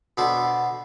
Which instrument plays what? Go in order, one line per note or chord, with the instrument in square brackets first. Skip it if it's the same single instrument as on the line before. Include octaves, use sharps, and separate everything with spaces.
[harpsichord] B2 B3 D4 A4 C5